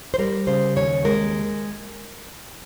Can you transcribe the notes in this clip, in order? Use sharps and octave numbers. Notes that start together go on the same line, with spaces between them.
C5
G3 A#4
C#3 C5
D#2 C#5
G#3 A#4